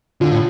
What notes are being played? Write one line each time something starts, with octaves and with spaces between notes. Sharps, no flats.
D3 F4
A2